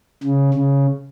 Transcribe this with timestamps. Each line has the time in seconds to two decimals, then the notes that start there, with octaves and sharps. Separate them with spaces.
0.24 C#3
0.54 C#3